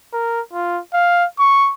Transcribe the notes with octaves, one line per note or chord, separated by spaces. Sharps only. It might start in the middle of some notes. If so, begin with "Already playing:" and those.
A#4
F4
F5
C#6